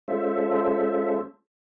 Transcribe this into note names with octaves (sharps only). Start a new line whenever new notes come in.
G#3 C#4 F4 A4 C5 E5